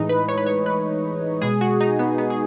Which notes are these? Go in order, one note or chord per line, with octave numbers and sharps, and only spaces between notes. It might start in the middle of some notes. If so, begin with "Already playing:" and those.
Already playing: A2 E3 G#3 D#4
B4
C#5
B4
C#5
B4
B2 G#3 G#4
F#4
D#4
B3
B3
G#4